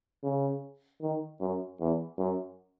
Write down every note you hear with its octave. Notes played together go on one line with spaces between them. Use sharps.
C#3
D#3
F#2
E2
F#2